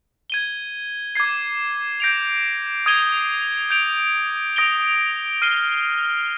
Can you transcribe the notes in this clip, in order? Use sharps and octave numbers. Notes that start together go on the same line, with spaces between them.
G#6 D#7 G7
D6 G#6 C7
G6 A#6 D7 F7
D#6 G#6 D#7 G7
G6 D7 F7
D#6 A#6 D7 G7
F6 C7 D#7 G7